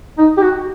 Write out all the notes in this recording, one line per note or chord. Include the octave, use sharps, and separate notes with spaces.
D#4
G4
F#4